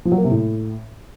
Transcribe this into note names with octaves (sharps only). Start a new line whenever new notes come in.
F3
F#3
A#3
C3
A2